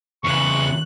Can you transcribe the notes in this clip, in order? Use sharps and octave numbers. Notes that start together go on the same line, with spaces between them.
E2 C#3 C#6 F#6